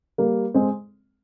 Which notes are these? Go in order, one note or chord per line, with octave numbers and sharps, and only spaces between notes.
G3 A#3
G#3 C4